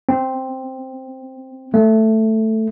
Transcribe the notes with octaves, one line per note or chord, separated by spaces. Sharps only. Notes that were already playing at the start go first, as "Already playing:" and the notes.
C4
A3